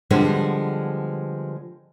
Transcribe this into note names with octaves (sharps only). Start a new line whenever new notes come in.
D3 F3 G3 G#3 B3